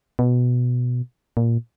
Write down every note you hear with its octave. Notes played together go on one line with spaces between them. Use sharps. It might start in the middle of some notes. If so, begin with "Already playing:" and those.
B2
A#2